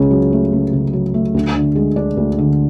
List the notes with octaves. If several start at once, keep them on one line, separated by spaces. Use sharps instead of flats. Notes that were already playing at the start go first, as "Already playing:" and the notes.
Already playing: C#2 C#3
F#3
A3
C#2
C#3
F#3
A3
D2
D3
G#3
D4
D2
D3